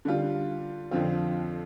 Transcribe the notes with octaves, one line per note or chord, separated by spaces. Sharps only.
D3 G3 F4
F2 D3 F3 C4 F4